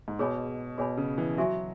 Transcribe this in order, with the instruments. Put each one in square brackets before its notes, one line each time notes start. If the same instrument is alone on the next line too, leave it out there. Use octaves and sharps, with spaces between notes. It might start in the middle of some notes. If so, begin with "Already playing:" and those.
[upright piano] G#2
[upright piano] B2 [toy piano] G#4 C#5 G#5 B5
[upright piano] B2 [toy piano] G#4 C#5 G#5 B5
[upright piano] C#3
E3
[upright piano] F#3 [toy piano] F#4 E5 G#5 C#6